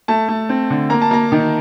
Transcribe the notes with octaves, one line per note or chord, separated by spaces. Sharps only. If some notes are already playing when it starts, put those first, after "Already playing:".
A3 A5
A3
C4
D3
A#3 A#5
A5
A#3 A#5
D#3